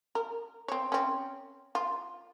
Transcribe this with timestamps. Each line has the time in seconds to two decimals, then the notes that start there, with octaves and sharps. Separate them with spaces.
0.15 A#4
0.68 C4 C#5
0.92 C4 C#4
1.75 F4